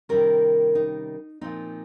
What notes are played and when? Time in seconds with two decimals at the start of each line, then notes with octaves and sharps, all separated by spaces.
0.09 C3 D#3 G3 C#4 A#4
0.75 D#4
1.41 A#2 F3 C4 D#4